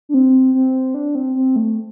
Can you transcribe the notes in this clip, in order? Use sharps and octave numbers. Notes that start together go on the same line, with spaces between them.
D4
C4
C4
D4
C4
C4
A3